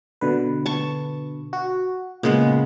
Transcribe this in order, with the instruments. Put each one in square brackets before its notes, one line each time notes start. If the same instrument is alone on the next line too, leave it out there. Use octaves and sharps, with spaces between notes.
[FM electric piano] B2 D3 B4
[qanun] A5 C#6
[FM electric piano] F#4
[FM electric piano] A#2 [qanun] C#3 G#3 B3